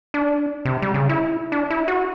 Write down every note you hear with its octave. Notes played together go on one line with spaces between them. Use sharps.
D4
C3
G3
C#3
E4
D4
E4
F#4